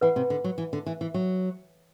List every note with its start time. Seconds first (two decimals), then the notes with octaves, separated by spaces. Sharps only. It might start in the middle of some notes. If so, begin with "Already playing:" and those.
0.01 E3 B4 F#5 B5
0.16 C3
0.30 D3
0.44 F#3
0.58 E3
0.73 D3
0.86 E3
1.01 E3
1.14 F#3